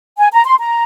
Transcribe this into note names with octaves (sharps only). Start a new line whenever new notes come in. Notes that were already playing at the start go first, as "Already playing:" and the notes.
G#5
A#5
C6
A#5